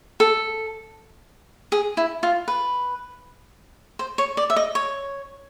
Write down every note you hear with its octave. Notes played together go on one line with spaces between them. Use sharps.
A4
G#4
E4
F4
B4
C5
C#5
D5
E5
D#5
C#5